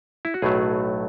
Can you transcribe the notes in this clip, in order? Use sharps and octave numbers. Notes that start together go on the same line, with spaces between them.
E4
F#4
B1 A2 F#3 A3 G#4